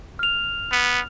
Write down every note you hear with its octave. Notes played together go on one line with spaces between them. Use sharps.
F6 F7
B3